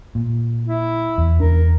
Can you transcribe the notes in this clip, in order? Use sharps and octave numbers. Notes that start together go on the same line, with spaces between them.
A#2
E4
E2
E2 D4 A#4